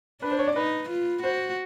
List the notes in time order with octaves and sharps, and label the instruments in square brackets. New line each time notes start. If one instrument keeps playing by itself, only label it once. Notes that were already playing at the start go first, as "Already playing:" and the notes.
[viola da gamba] D4 [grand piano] B4
[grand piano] C5
C#5
D5
[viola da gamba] D#4 [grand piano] B4
[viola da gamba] F4
[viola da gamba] F#4 [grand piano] C5